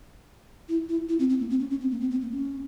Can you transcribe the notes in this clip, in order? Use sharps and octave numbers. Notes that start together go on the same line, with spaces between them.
E4
E4
E4
C4
C4
A#3
C4
C#4
C#4
C4
A#3
C4
C4
A#3
C#4